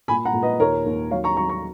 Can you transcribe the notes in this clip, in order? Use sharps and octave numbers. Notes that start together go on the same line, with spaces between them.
A#2 G#5 B5
F#5 A#5
A#2
B4 D#5
D#2 A#4 C#5
D#2
F#3 C#5 F5
A#5 C#6
F#3 A#5 C#6
A#5 C#6